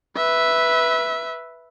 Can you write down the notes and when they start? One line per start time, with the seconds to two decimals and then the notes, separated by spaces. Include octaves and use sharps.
0.17 B4 E5